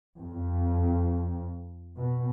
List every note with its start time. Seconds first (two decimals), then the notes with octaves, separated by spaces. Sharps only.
0.18 F2
1.96 B2